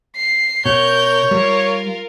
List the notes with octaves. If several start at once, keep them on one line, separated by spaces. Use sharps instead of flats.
C7
B2 A#4 C#5 G6
G3 F4 A#4